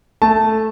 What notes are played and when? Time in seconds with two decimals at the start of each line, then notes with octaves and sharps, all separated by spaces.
0.22 A3 A5